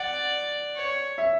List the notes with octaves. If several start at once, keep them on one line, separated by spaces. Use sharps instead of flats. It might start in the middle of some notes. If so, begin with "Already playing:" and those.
Already playing: D5 F#5
C#5
E5